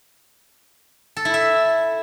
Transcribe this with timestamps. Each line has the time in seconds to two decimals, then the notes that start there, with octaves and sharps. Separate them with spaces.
1.17 A4
1.25 E4
1.34 E5